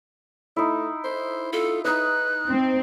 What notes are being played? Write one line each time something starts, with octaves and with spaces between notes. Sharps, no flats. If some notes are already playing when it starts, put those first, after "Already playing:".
A3 D#4 E4
C5
F4 A4
D#4 B4 D#5 F#6
C4